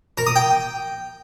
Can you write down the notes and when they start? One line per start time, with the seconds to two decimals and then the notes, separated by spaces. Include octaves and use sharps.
0.18 A#4
0.27 D#6
0.36 G5